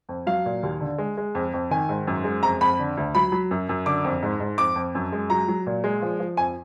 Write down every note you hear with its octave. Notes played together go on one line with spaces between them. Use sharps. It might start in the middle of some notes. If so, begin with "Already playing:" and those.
F2
F#3 F5
A#2
D#2
D3
G#3
G#3
F2
F2
D#3 G#5
G#2
F#2
G#3
F2 A#5
F2 B5
D3
D2
F#3 B5
F#3
F#2
F#2
D3 D6
F2
G#2
G#2
F2 D6
F2
F#2
G#3
F#3 A#5
F#3
A#2
G#3
F3
F3
F2 G#5